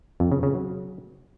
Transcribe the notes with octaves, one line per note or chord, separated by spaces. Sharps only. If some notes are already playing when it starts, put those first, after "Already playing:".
F2
C#3
C#3
F#3